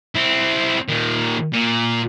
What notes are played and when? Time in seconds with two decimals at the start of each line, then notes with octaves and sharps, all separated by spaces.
0.16 C4 E4
0.89 A#2 D#3
1.53 A#2